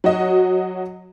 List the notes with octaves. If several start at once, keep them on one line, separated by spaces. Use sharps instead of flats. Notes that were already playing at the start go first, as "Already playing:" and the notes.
F#3 F#4 D#5